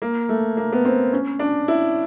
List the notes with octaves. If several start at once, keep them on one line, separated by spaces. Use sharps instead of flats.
A#3
A3
A#3
B3
C4
C#4
D4
E4